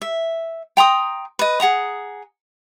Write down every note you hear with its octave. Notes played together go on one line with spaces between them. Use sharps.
E5
G5 A#5 C6 D#6
B4 D#5
G#4 F#5 A#5 D#6